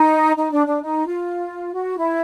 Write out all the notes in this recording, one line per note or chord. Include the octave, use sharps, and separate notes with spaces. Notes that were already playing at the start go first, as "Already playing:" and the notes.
Already playing: D#4
D#4
D4
D4
D#4
F4
F#4
E4